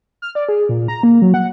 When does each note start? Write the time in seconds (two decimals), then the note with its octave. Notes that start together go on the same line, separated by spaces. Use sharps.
0.22 F6
0.35 D5
0.49 G#4
0.69 A#2
0.88 A#5
1.03 A#3
1.22 F#3
1.34 F#5